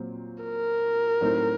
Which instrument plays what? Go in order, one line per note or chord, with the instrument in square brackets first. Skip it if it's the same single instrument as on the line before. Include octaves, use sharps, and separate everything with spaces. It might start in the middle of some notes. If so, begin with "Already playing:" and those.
Already playing: [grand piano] A#2 F#3 C4
[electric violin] A#4
[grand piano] A2 F#3 C4 D#4